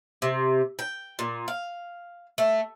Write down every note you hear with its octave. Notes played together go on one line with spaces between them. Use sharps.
C3
G5
A#2
F5
A3